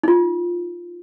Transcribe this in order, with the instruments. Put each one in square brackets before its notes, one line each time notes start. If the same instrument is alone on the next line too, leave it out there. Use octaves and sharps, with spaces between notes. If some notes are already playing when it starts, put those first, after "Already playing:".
[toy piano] D#4 F4